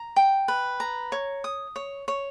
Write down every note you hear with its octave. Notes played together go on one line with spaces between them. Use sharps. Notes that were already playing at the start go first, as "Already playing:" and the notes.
Already playing: A#5
G5
B4
A#5
C#5
D#6
C#5
C#5